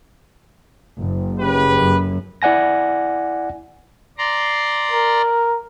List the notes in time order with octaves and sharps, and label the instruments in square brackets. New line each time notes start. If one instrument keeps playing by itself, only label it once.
[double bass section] F#1
[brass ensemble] C#3 G4 B4
[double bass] F#2
[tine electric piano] E4 D5 F#5 G#5 A#6
[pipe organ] D5 A#5 C6
[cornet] A#4